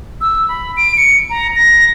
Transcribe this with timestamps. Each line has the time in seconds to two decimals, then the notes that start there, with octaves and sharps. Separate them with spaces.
0.21 E6
0.49 B5
0.77 D7
0.97 C#7
1.30 A#5
1.56 A#6